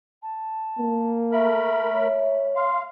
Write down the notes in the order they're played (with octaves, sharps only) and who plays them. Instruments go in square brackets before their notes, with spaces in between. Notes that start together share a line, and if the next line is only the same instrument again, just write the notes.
[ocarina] A5
[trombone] A#3
[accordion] A3 A#4 B5 [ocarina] E5
[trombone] C#5
[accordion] F5 [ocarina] C6